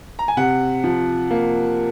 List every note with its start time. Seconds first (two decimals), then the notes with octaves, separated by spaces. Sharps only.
0.19 A#5
0.28 G#5
0.37 C3 F#5
0.84 F3
1.31 A#3